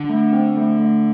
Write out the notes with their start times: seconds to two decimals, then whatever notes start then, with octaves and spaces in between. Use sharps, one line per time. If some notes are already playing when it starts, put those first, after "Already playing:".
Already playing: D3
0.09 A3
0.33 C4
0.57 A3
0.80 A3